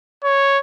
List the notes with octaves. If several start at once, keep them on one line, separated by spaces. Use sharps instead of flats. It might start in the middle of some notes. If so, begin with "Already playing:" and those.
C#5